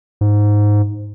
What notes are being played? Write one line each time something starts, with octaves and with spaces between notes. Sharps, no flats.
G#2